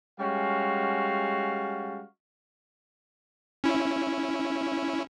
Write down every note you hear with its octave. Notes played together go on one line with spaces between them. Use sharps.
G3 G#3 C#4 F#4 F5
C#4 E4